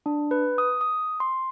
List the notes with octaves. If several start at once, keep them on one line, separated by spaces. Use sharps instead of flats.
D4
B4
D#6
D#6
C6